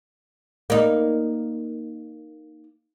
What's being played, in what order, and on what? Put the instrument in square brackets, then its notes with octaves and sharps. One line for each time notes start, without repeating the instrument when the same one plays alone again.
[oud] A#3 D#4